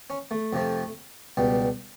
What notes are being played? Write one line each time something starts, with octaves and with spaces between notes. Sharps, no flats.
C#4
A3
F2 C3 F3
C#2 B2 G3